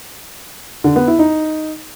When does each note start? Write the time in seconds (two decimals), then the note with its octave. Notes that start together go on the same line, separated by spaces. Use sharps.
0.84 D3
0.96 B3
1.07 E4
1.19 D#4